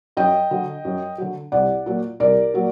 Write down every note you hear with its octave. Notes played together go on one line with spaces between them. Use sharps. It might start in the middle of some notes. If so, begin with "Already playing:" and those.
F#2 D#5 G5
D3 F#3
F#2
D3 F#3
C2 D5 F#5
A#2 F#3
C2 A#4 D5
A#2 F#3